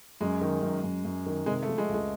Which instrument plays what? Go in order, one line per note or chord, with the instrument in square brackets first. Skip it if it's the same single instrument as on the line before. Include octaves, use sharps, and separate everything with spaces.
[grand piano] F#2 [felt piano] G#3
[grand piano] D#3
F#2
F#2
F#2
D#3
[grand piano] C3 [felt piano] G#3
[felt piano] A3
[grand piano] F3
[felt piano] G#3
[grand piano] C#2
[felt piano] G#3